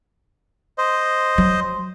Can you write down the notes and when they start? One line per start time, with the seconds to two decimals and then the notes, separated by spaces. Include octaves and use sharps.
0.78 C5 D#5
1.38 F#3